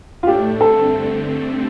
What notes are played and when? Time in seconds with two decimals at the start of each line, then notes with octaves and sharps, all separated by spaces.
0.23 F4
0.27 A2 A3 D4 G4
0.60 G2 D3 A3 C4 A4